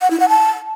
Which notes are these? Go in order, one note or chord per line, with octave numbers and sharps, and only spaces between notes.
F#5
E4
F#5
A5